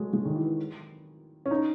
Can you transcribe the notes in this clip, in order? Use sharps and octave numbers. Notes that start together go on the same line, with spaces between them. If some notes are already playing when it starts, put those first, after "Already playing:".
Already playing: F#3 G#3 A3
G#3
D#3
E3
C#4
D#4